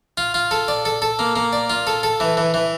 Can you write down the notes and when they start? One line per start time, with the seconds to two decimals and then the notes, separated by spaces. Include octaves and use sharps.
0.17 F4
0.34 F4
0.51 A4
0.68 D5
0.85 A4
1.02 A4
1.19 A#3
1.36 A#3
1.53 D5
1.70 F4
1.87 A4
2.03 A4
2.20 E3
2.37 E3
2.54 E3